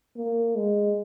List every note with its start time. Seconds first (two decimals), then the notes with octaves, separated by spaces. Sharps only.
0.16 A#3
0.56 G#3